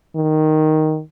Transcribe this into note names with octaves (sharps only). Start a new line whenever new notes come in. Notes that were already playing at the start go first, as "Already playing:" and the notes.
D#3